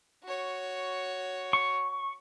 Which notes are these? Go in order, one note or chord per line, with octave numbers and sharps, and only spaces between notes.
F#4 C#5
C#6